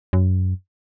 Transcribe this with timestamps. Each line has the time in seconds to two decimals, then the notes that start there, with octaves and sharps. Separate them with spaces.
0.13 F#2